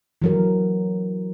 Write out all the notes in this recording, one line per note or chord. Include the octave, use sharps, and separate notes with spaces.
E3 F#3 A#4